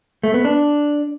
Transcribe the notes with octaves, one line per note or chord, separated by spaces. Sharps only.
A3
B3
D4